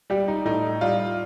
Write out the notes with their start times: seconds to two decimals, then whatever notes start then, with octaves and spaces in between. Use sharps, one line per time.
0.10 G3 G4
0.28 D#4
0.45 A2 D#4
0.81 G3 F4